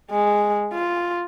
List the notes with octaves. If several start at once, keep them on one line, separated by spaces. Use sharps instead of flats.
G#3
F4